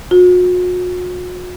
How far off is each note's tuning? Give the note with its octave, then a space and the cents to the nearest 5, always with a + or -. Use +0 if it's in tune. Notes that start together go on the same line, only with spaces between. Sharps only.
F#4 -40